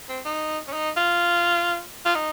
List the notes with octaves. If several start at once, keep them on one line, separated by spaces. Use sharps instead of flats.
C4
D#4
C#4
D#4
F4
F4
D#4